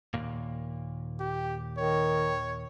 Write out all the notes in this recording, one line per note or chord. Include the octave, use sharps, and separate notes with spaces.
D#2 A#2
G4
D#3 C#5